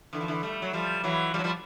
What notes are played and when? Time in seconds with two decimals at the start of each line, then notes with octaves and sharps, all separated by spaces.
0.13 D3 E3
0.21 F3
0.28 D3 E3
0.43 G3 A3
0.62 F#3
0.73 F3 G3
1.04 E3 F#3
1.34 F3 G3
1.39 F#3
1.44 F3 G3